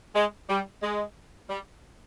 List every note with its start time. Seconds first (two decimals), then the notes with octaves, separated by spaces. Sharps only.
0.15 G#3
0.49 G3
0.82 G#3
1.49 G3